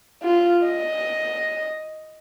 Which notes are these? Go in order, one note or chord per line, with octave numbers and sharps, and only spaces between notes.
F4
D#5